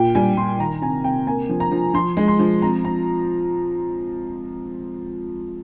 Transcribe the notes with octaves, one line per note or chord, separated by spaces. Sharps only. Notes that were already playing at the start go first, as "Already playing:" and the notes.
Already playing: A#2 G5
G3 G#5
G3 C6
D#3 A#5
C3 G#5
C3 G5
A#3 G#5
F3
A#5
F3
F3 C6
G#3
C6
F3
C4 A#5
C4 A#5